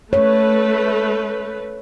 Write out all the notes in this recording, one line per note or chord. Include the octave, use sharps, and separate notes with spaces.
A3 B4 C#5